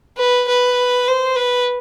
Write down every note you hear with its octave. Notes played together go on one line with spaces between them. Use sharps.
B4
B4
C5
B4